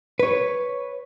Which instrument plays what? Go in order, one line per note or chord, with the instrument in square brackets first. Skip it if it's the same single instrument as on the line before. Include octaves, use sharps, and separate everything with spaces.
[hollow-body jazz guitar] B4 C#5